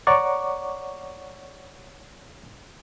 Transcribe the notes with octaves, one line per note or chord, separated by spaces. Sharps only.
C#5 D5 F#5 A#5 C#6 D6